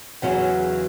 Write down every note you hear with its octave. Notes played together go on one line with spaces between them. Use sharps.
E2 C#3 F#3 C#4 F#4